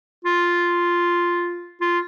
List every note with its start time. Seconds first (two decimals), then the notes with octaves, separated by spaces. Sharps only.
0.24 F4
1.81 F4